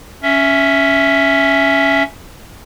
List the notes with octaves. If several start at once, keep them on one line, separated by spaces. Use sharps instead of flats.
C#4 E5